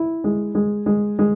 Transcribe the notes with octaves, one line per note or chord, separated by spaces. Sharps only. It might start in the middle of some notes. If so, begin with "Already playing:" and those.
Already playing: E4
G#3
G#3
G#3
G#3